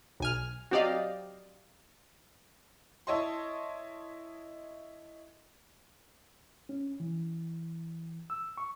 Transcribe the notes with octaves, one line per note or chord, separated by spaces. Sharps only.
B1 G#5 F6
F#3 C4 G4 D5 D#5 F5
E4 C#5 D#5 A5 C6
C#4
E3
E6
C#6